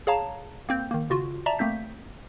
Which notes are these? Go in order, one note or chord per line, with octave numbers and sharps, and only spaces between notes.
G#4 C#5 F5 A5 A#5
A#3 C4 G6
D#3 A#3
C#3 F4 F#4
D5 E5 A5 A#5
A3 A#3 C4 G6 B6